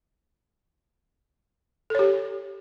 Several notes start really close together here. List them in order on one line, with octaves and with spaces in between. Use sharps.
A4 C#5 G4